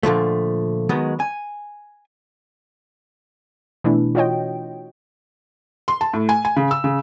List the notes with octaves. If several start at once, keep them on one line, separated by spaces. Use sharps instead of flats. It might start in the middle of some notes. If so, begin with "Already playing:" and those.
A#2 D3 F3 A3
D#3 F#3 G#3 B3
G#5
B2 E3 A3 D4 E4
F4 F#4 C#5 D#5 G5
C6
A5
A2
G#5
G#5
C#3
E6
C#3